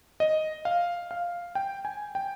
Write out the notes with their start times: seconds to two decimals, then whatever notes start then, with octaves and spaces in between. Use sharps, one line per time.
0.20 D#5
0.65 F5
1.11 F5
1.55 G5
1.85 G#5
2.15 G5